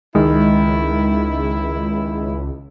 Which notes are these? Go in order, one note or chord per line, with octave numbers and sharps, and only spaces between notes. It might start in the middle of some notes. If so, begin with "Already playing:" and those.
C#2 D#3 G#3 E4